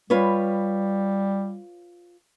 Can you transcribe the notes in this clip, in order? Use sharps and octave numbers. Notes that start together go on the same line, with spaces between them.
G3 F4 B4 C#5